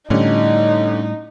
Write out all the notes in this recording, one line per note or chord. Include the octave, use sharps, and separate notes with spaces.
A2 D3 G3 C#4 D#4